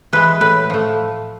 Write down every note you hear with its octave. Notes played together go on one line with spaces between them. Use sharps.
E3 G#3 B4
A2 B4
F3 A3